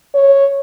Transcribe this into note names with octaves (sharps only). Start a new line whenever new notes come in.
C#5